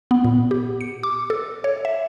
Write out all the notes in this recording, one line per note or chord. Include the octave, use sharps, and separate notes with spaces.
B3
A#2
G4
C#7
D6
A4
C#5
E5